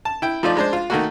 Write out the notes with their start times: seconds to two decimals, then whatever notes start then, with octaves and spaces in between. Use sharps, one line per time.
0.05 A5
0.22 E4 G5
0.43 F3 A3 D#4 F4 D5
0.57 G#3 D4 C5
0.73 F4
0.90 D#3 A3 A#3 F#4